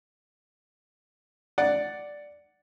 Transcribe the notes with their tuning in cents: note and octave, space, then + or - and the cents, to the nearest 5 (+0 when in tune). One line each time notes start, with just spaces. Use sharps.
D5 +0 F#5 +5